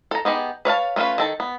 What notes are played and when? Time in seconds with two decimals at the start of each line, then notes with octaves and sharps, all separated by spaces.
0.11 A4 A#5
0.25 B3 D#4 G4 G#4
0.65 B4 C#5 F5 A5
0.96 A3 C#4 E4 F4 B4
1.18 D#3 A4 A5
1.40 B3